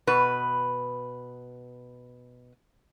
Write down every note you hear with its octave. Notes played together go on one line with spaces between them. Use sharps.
B2 B4